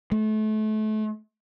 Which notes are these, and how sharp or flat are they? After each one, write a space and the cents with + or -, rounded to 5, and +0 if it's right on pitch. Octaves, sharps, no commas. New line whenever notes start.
A3 -30